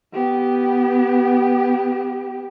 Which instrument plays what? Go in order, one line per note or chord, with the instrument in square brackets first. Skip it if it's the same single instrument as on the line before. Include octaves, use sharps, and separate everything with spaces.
[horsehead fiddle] B3 G4